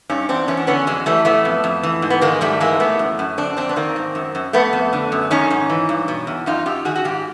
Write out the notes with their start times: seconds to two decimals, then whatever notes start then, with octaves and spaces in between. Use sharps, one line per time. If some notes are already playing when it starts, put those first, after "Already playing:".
0.10 G2 C#4 D#4
0.29 E2 C4 D4
0.48 E2 B3 C#4
0.57 D4
0.67 D3 B3 C#4
0.87 F2 F#3 G#3
1.06 E3 G3 A3
1.25 A2 A3 B3
1.45 F2
1.64 F2
1.83 E3
2.02 G#2
2.10 B3
2.21 D#3 G#3 A#3
2.41 G#2 G3 A3
2.60 E3 G#3 A#3
2.80 A2 A3 B3
2.99 F#2
3.19 F#2
3.38 D3 C4 D4
3.57 F2 C4 D4
3.69 B3
3.76 D#3 A#3 C4
3.96 G#2
4.15 F#2
4.35 F#2
4.53 F2 A3 B3
4.73 F2
4.93 D3
5.12 F#2
5.31 D#3 C#4 D#4
5.51 G#2
5.70 E3
5.89 G2
6.08 B2
6.27 E2
6.46 F#2 D#4 F4
6.66 F#2 F4 G4
6.85 D#3 F#4 G#4
6.96 F#4
7.05 G#2 F4 G4